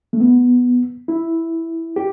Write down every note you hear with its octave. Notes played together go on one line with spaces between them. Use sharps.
A3
B3
E4
G4